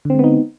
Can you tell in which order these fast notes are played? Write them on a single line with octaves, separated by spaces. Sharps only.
D3 C4 G#3 B3 D#4